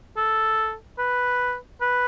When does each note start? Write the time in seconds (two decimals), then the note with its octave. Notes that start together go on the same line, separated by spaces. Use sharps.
0.17 A4
0.98 B4
1.81 B4